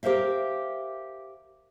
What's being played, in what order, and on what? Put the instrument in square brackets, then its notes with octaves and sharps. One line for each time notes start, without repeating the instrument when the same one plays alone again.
[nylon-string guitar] G4 A#4 C5 E5 F5